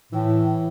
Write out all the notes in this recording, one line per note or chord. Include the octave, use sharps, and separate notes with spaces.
A2 E3